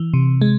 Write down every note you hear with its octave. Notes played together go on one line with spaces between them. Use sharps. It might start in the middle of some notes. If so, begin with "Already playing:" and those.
Already playing: E3
C3
G#3